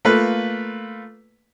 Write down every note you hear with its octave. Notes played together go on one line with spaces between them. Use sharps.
A3 A#3 F4 B4